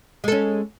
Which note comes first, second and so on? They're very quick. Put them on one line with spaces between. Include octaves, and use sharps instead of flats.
G#3 A4 C#4